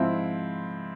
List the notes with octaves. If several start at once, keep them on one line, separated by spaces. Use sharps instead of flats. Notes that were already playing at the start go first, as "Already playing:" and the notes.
Already playing: G#2 F3 C4 E4